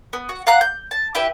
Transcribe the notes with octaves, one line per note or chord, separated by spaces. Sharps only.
B3
F#4
F5 F#5 A#5 F#6
G6
A5
E4 G4 B4 E5